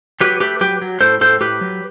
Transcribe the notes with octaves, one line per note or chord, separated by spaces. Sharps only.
F#3 G4 B4
A3 G4 B4
F#3 G4 B4
F#3
A2 A4 C5
A2 A4 C5
A2 G4 B4
F#3